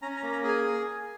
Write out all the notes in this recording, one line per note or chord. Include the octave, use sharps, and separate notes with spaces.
C#4 A#5
A#5
A#3
A#5
G#4
G#5